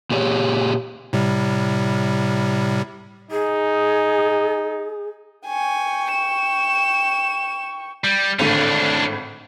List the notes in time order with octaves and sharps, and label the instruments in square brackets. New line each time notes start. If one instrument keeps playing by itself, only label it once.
[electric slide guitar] A#2 G4 G#4 C#5
[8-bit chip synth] A2 C3 G3
[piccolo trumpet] D#4 [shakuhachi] G#4
[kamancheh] G5 C#6 [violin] G#5
[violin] E7
[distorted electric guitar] G3
[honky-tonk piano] G#1 A2 D3 [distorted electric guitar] C#4 D4